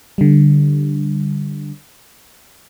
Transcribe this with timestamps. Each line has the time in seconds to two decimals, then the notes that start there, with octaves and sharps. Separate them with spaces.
0.18 D3 G3